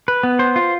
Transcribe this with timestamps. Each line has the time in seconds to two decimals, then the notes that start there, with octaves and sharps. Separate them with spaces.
0.08 B4
0.23 B3
0.39 C5
0.56 F4